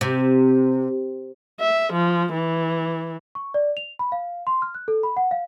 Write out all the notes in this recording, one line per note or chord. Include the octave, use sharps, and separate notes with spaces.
C3
E5
F3
E3
C#6
D5
F7
B5
F5
C6
F6
F#6
A4
B5
F#5
F5